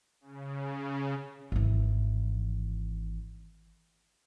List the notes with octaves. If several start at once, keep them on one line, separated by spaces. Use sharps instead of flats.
C#3
G#1 E3